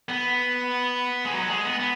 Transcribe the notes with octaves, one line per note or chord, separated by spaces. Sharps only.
B3
G#3
F#3
G#3
B3
B3